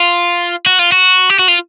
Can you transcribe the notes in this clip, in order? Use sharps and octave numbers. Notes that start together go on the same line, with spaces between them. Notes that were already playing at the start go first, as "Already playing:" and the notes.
Already playing: F4
F#4
F4
F#4
G4
F#4
F4